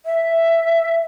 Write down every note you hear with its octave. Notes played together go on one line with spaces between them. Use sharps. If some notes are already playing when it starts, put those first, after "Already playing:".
E5